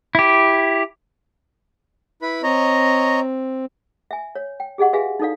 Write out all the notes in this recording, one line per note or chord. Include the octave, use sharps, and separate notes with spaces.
E4 G4
E4 B4 B5
C4 C#5 D#5 A#5
E5 G#5
C#5
G5
G4 G#4 D#5 F#5 C#6
F#4 G#4 B4 E5 F5 G#5
D#4 E4 A4 D5 F5